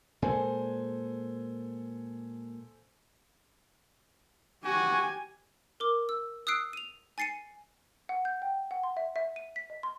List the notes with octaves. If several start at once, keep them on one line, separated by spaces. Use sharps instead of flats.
A#2 G#3 A4 C5 G#5
F#4 G4 G#5
A#4 D6
E6
D#6 E6 F#6 C7 D7
D#7 F7
G#5 A6 C7 C#7 D#7
F#5
G6
G5
F#5
C6
E5
E5
D#7
B6
D#5
C6